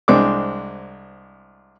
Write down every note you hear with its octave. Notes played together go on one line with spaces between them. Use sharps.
C2 G#3 C4 D4 D6